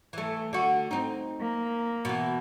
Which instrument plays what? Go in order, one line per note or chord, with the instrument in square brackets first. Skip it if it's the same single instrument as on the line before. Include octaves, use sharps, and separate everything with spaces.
[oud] E3 A3
D3 F#4
C4 D#4
[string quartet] A#3
[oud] B2 E3